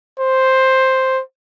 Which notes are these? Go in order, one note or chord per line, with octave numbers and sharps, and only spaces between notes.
C5